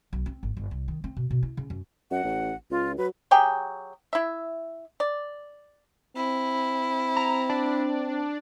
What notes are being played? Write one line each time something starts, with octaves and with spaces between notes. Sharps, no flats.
B1
C4
G#1
G1
C2
D#3
C4
B2
B2
E4
C#3
F#2
F#2 F#5
A1
C#2 F4
F#3 B4
F#3 G4 G#4 G5
E4 E5
D5
C4 E4
A#5
D4